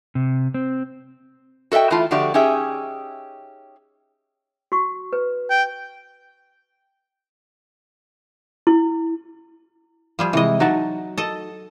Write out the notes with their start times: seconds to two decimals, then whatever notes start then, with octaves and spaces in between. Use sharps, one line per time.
0.15 C3
0.54 C4
1.72 F#4 A4 D#5 E5 G5
1.90 E3 A3 E4 F4 A5
2.11 D3 F3 A3 F#4 G4 D5
2.34 C#4 D#4 G4 G#4 E5
4.72 F#4 C#6
5.13 B4
5.50 G5
8.67 E4
10.19 F3 G3 G#4
10.33 C3 E3 G#3 D#5
10.60 F#3 D#4 F#4 A5
11.18 A4 D#5